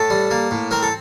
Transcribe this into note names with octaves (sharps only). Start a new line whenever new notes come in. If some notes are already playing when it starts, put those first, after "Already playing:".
Already playing: A2 A4
G3
A#3
A2
C4 A#4
A4